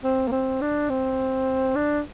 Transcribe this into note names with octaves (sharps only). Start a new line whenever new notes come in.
C4
A#3
C4
D4
C4
D4